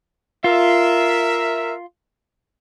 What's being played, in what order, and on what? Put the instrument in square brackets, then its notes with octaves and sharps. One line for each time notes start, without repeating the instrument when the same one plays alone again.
[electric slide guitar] F4 [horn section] A#4 E5